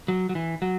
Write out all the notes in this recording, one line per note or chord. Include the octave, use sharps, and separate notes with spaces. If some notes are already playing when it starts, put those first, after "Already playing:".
F#3
F#3
E3
F#3